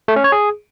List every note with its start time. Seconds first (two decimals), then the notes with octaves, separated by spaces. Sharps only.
0.08 A3
0.16 C#4
0.24 C#5
0.32 G#4